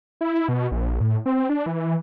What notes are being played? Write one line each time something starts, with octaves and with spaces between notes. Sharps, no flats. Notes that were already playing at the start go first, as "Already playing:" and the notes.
E4
B2
A#1
A2
C4
D4
E3